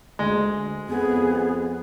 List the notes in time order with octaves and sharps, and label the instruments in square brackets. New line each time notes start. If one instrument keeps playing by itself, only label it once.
[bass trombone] D2 [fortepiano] G#3
[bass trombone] F2 [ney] B3 [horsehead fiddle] G#4